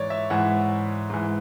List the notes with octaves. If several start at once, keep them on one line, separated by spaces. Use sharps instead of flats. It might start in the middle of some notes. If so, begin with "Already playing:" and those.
Already playing: G#2 E3 C#5 D5
E5
G#2 E3 F#5
G#2 E3